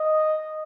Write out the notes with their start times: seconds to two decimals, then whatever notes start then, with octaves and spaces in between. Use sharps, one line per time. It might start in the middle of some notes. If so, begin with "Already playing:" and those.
Already playing: D#5